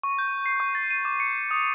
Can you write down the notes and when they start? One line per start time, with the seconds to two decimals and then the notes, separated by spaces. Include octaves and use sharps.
0.03 C#6
0.19 G6
0.46 C7
0.60 C#6
0.75 A6
0.90 D#7
1.05 D6
1.20 C#7
1.51 D#6